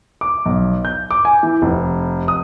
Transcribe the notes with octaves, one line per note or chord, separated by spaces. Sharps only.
D6
B1
G6
D6
G#5
E3
F1
D#6